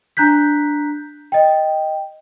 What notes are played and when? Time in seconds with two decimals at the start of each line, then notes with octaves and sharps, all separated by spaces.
0.17 D4 A#5 F#6 G6 B6
1.32 D#5 G5